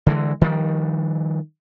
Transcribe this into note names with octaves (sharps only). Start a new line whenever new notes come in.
D3 E3 G#3
D#3 F3 G3